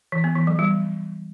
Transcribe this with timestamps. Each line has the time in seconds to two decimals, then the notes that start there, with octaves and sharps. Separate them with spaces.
0.12 E3
0.24 B3
0.36 E3
0.47 F#3
0.59 G3